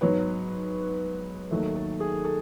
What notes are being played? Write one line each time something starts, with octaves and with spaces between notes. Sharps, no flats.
G#2 F#3 B3 C#5
D#2 D#3 F#3 A3
A4
G#4
A4